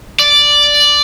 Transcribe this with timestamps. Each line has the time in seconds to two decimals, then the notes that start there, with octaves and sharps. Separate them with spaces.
0.19 D5